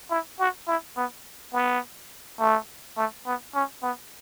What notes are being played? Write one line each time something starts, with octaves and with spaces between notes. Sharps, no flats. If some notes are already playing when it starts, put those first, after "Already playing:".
E4
F#4
E4
B3
B3
A3
A3
B3
C#4
B3